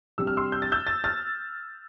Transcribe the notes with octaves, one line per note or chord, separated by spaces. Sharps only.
C3 G3 D4 G4 E6
F6
C6 E6
G6
A6
E6 G6
A6
F6 A6